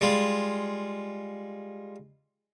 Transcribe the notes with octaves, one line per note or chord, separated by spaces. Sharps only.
G3 G#3 F4